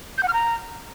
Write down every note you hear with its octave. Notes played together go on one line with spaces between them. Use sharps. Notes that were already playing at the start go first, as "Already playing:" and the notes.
G6
F#5
F6
A#5